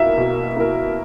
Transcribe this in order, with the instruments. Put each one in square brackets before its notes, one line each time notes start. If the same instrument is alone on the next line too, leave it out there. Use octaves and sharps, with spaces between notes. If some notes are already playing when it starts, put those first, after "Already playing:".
Already playing: [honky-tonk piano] B2 A#3 E4 A#4 [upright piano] E5
[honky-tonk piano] B2
A#3 E4 A#4